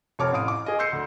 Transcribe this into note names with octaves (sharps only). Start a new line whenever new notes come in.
F1 C#5 A5 D6 F6
A1 F5 D#6 D7
D6
G#4 D#5
C6 E6 G6 C7 C#7
D2